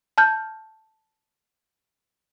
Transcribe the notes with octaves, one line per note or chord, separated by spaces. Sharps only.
A5 F6 G6